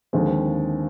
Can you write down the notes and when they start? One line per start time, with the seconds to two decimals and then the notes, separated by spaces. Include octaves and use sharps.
0.13 D#2 D3 F3 G#3 C4